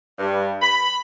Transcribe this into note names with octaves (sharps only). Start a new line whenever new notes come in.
G2
B5